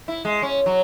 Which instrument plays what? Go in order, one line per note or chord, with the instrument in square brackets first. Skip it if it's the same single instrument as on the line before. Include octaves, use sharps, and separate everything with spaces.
[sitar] E4
G#3
C#4
F#3